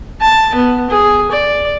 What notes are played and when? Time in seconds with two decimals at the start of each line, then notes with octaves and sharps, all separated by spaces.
0.21 A5
0.55 B3
0.90 G#4
1.32 D5